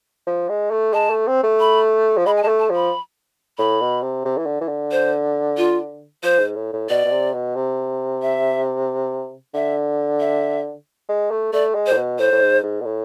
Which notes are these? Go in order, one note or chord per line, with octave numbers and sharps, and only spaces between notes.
F3
G#3
A3
G#3 A5
A3
C4
A3
B5
F3
G#3 B5
G#5
G#3 A5
A3
A5
F3 B5
A2 B5
B2
C3
C3
E3
D3
E3
D3
C5
F4
F3 C5
G#2
A2
A2
B2 D5
B2
C3
B2
C3
E5
D3 E5
E5
G#3
A3
A3 D5
G#3
C5
A2
B2
A2 C5
A2
G#2
G#2
B2
A2